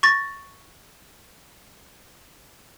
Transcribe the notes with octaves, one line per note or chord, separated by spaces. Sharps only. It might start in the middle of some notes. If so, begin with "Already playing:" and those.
C#6 A6 A#6